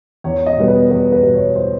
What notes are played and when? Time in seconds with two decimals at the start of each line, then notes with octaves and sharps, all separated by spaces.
0.24 E2 C#5
0.46 D#5
0.57 B2 G3 B3
0.68 B4
0.90 E2 B4
1.12 B4
1.23 B2 G3 B3
1.34 C#5
1.56 C5